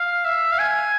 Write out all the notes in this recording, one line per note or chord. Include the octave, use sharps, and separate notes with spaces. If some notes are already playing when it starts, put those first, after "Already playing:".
Already playing: F5
E5
F5
G#5